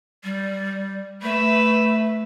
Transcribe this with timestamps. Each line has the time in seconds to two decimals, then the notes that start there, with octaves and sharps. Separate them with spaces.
0.23 G3
1.22 A3 B4 E5